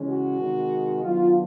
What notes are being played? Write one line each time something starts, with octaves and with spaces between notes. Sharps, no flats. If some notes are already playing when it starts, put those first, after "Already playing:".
Already playing: C#3 E3 G#3 C#4
F#4
C3 D#3 G#3
D#3 F#3 B3 D4 F4